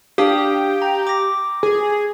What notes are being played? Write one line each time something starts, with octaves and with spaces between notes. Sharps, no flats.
D4 G4 F5 D#6
A#5
D6 A#6
G#4